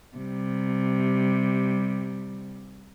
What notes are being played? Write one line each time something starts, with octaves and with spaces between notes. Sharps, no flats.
C3 G3